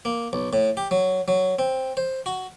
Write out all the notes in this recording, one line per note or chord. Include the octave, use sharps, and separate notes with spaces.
A#3
B1
A2
G4
F#3
F#3
C4
C5
F#4